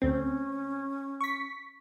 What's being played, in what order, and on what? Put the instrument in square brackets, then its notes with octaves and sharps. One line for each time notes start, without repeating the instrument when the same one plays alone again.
[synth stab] D2 C4 [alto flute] C#4
[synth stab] C#6 B6